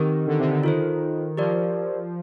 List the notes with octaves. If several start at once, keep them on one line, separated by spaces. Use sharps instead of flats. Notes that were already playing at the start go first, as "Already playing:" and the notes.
Already playing: D#3 C4 G4 A#4
D3
C3
D3
D#3 F4 A4 C5
F3 G4 A#4 D5